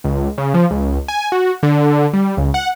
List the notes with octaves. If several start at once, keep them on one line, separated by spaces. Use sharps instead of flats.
C#2
C#3
F3
C#2
G#5
F#4
D3
G3
C#2
F#5